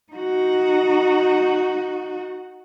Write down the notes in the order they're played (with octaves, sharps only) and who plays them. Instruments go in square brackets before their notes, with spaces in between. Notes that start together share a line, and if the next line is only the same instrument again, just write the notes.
[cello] D#4 F#4